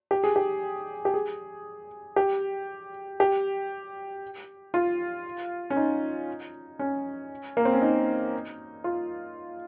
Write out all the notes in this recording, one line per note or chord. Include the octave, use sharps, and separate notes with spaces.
G4
G#4
G4
G4
G#4
G4
G4
F4
C#4
D#4
C#4
A#3
C4
C#4
D#4
F4